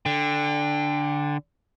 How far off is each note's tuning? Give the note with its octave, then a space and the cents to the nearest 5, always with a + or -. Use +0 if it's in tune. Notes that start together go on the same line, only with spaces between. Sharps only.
D3 +0 G5 +20